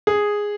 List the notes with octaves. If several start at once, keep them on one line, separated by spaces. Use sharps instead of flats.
G#4